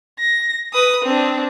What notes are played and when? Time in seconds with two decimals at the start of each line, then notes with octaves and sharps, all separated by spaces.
0.19 A#6
0.73 B4 D#6
1.04 C4 D4